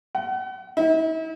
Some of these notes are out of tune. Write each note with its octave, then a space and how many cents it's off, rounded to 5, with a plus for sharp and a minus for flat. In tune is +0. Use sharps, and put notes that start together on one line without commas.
F#5 +35
E4 -45